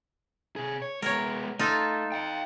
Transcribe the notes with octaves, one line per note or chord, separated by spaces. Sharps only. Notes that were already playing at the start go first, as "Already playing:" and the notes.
C3 G#4
C#5
G#3 B3 A#4 C#5
A3 D#4 F4 A4
F5 G5